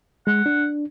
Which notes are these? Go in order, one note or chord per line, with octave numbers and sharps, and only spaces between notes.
G#3 F#5
D4